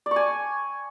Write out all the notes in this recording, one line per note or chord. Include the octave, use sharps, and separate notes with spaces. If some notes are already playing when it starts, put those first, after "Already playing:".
D5
C#6
G#5